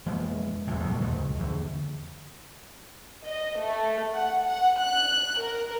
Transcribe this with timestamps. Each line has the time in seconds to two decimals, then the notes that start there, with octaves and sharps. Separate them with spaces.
0.06 F2 E3 G#3 A#3
0.67 A1 E2 A2
0.83 C2 F2 A#2 F#3
1.01 D#2 G#2 A3
1.16 C#2
1.39 E2 D3
3.25 D#5
3.59 A3
4.15 F#5
4.49 F#5
4.81 F#6
5.41 A#4